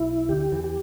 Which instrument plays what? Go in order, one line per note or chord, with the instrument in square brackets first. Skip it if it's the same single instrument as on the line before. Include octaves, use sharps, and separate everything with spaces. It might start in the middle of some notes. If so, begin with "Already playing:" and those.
Already playing: [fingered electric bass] B1 B2 [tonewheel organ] E4
[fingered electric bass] D2 D3 [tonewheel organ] G4
[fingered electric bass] E2 E3
[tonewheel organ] G4